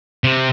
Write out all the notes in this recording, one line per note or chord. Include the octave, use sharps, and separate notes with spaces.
C3